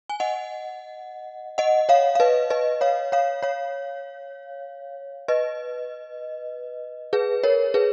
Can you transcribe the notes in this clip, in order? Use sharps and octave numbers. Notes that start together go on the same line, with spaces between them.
G#5
D#5 F#5
D#5 F#5
C#5 F5
F5
B4 D#5
B4 D#5
C#5 F5
C#5 F5
C#5 F5
B4 D#5
G#4 B4
A#4 C#5
G#4 B4